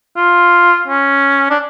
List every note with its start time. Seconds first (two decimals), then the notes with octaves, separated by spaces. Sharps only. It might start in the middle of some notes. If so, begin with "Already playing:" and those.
0.17 F4
0.88 C#4
1.50 D4